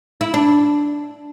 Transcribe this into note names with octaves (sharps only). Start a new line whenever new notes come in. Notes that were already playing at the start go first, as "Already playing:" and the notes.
E4
D4